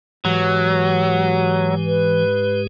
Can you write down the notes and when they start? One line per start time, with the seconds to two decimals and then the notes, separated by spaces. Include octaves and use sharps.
0.25 G#2 E3 F#3 G#3 G4
1.86 B4